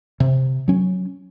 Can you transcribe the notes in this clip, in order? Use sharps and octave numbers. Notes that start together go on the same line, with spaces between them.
C3
F#3 C#4